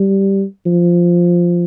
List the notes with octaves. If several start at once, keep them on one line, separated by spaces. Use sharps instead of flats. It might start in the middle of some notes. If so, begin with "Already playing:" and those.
Already playing: G3
F3